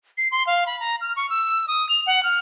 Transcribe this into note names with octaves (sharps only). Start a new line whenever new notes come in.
C7
C6
F5
B5
A#5
F6
C#6
E6
D#6
F7
F#5
F6